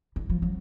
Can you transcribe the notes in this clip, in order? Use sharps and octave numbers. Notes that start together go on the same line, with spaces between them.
E3
F3
F#3